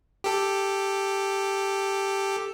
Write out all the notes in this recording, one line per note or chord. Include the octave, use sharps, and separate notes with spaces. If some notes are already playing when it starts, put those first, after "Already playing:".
G4 A4